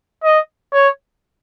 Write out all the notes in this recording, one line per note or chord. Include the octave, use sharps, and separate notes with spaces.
D#5
C#5